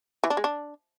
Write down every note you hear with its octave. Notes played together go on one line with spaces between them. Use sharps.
E3
D4
G#3
D4